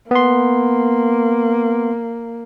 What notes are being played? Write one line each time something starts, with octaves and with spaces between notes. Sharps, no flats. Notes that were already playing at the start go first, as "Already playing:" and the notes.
A#3 B3 C6